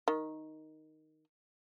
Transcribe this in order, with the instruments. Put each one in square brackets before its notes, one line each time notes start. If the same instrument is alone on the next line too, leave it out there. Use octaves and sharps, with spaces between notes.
[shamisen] D#3